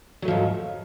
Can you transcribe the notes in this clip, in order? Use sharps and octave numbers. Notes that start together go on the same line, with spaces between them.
G#2 F3 F#3 A3